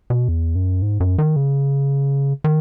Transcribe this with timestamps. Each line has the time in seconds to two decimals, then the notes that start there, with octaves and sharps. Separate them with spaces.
0.10 B2
0.28 E2
0.55 F#2
0.82 G#2
1.00 F#2
1.18 D#3
1.36 C#3
2.44 D#3